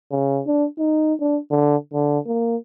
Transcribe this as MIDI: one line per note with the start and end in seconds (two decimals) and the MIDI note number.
0.11 0.41 49
0.47 0.66 62
0.79 1.14 63
1.20 1.39 62
1.51 1.76 50
1.93 2.19 50
2.26 2.57 58